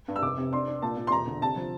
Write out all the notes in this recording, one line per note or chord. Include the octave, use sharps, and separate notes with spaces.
G2
E6
F1 D6
C3
D4 C6
D4
A#2 A5
A#2
C6
E1 A#5
D3
C3 A5
F3